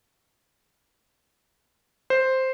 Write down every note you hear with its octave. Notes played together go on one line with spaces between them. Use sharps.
C5